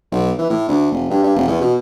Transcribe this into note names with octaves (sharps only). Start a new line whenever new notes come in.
B1
E3
A2
D2
F1
G2
G2
F1
E2
B2